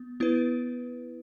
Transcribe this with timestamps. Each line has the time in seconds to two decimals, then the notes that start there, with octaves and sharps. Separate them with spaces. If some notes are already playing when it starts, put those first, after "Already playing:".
Already playing: B3
0.20 B3 E4 B4